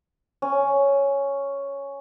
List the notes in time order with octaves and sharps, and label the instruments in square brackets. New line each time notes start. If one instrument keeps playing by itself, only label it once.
[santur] C#4